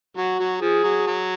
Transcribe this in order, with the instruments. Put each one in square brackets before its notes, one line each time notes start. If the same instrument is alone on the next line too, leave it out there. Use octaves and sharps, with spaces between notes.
[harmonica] F#3 [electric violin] F#4
[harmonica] F#3
[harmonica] F3 [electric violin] G#4
[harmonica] F#3
F#3